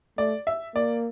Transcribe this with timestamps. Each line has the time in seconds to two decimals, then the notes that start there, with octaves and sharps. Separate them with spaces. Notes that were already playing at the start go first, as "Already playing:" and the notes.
0.18 A3 D5
0.47 E5
0.75 A#3 D5